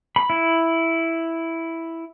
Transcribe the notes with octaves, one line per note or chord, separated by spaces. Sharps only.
B5
E4